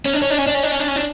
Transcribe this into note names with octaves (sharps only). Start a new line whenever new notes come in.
C#4
D4
C#4
D4
C#4
D4
C#4
D4
C#4
D4
C#4
D4